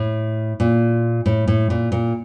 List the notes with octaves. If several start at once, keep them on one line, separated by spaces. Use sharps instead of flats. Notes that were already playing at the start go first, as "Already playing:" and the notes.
Already playing: A2
A#2
A2
A2
A#2
A#2